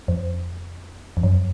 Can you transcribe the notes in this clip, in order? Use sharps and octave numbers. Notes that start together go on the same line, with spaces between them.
F2
F2
F#2